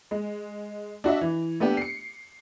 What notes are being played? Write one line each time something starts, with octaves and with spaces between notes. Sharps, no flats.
G#3
D4 F#4 D#5 E5
E3
A3 B3 D4 G4
C7 C#7